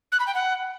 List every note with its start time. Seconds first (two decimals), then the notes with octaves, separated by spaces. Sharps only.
0.12 F#6
0.19 B5
0.27 G5
0.34 F#5